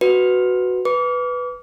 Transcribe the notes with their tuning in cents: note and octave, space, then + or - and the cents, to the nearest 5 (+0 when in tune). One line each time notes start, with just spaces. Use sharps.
F#4 +0 B4 +0
B4 +0 D6 -35